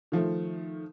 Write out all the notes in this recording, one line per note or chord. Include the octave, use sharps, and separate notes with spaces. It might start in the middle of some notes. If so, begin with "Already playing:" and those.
D#3 F3 A3